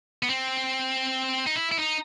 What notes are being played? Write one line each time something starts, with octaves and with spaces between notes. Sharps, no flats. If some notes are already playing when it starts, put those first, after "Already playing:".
B3
C4
D#4
E4
E4
D#4